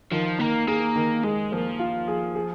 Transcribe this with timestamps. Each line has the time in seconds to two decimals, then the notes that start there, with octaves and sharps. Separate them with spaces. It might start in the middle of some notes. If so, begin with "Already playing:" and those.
0.11 D#3 F3
0.40 D#3 A#3
0.68 A#3 G#4
0.96 D#3
1.23 G#3 G#4
1.52 F3 A#3
1.79 F4
2.08 G#4
2.35 G#4